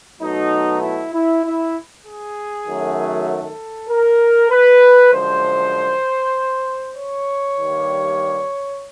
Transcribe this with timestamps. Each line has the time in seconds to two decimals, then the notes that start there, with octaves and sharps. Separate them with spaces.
0.21 B2 F#3 A3 D#4
0.82 E4
1.13 E4
1.44 E4
2.05 G#4
2.66 F#2 D#3 F#3 A3
3.28 A4
3.89 A#4
4.50 B4
5.12 F#2 D3 F3 G#3 C5
6.96 C#5
7.57 G2 D#3 G3 A#3